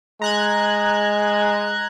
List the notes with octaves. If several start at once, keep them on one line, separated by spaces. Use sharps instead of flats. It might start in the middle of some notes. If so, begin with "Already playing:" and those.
G#3 A#5 F#6 G#6